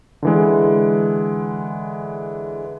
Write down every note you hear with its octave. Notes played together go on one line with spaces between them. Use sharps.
D3 E3 G#3